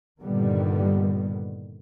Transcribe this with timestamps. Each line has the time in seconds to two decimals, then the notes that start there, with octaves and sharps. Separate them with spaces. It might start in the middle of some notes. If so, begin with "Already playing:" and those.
0.21 G2 A#2 D3 D#3 G3 B3